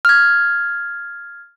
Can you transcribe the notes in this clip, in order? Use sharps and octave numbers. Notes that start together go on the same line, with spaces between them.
F6 G#6